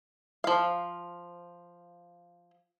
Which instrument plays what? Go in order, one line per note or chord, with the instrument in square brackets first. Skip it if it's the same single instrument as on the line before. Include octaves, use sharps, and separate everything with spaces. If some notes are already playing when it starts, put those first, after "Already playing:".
[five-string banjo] F3 F5